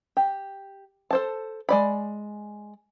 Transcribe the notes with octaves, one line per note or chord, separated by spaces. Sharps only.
G4
A4 C5 A5
G#3 D5 B5